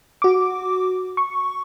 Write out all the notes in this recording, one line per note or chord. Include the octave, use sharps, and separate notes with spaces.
F#4 D6
C#6